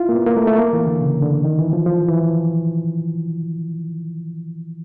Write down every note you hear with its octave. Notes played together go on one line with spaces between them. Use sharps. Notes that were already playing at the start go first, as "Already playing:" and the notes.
Already playing: E4 F4
A#3
B3
A#3
A3
A3
A#3
E3
D3
C#3
D3
D#3
E3
F3
F3
E3